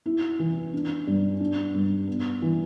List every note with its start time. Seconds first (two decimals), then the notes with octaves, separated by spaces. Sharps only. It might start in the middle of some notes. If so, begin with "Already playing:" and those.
0.06 E4
0.39 E3
0.73 D4
1.07 G2
1.40 D4
1.74 G2
2.07 B3
2.42 E3